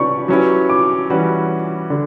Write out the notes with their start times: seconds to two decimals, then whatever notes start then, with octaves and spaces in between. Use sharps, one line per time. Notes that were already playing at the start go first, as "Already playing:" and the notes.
Already playing: C#4 G4 B4 D5 B5 C#6
0.28 F#3 C#4 E4 G4 B4
0.69 D6
1.10 E3 G3 C#4 F#4 B4
1.90 D3